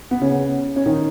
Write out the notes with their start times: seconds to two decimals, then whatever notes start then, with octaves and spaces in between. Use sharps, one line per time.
0.11 B3
0.21 C#3 C#4
0.76 C#4
0.86 D#3 D#4